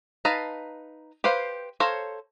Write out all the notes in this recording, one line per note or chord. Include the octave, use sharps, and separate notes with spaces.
D#4 B4 F5 A5 A#5
G4 B4 C5 F5
A4 C5 C#5 F5 A#5